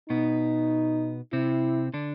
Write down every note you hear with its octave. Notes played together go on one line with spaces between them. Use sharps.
B2 B3 D#4
C3 C4 E4
D3 D4